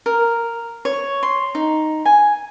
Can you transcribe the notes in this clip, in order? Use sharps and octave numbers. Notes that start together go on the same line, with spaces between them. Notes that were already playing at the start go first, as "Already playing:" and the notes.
A#4
C#5
C6
D#4
G#5